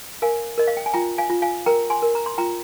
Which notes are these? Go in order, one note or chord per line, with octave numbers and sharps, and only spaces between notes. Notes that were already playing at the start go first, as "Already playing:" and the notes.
A#4 F5 G#5
A#4 D#5
F5
G5
G#5
F4 G5 A#5
F5 G#5
F4
F5 G#5
A#4 G5 A#5
G#5 C6
A#4
A#5
C6
F4 G5 A#5